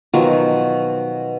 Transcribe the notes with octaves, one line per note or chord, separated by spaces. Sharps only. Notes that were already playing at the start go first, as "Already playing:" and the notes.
B2 D#3 F3 F#3